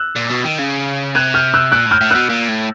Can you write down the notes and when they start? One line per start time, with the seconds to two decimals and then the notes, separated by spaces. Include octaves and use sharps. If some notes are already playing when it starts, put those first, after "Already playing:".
Already playing: E6 F#6
0.16 A#2
0.29 B2
0.44 D#3
0.58 C#3
1.15 C3 F#6 G#6
1.34 F6 G6
1.54 E6 F#6
1.72 A#2 E6 F#6
1.86 A2 F6 G6
2.01 A2
2.11 B2 E6 F#6
2.29 A#2
2.48 A2